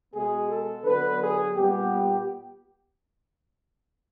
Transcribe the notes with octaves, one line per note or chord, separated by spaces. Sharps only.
B2 G#3 B3 G#4
A4
D3 F#3 B3 B4
G#4
A#2 G3 B3 G4